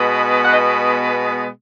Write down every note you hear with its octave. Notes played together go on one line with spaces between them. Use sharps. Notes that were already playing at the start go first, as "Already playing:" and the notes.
Already playing: B2 G#3 B3
F#5
D#5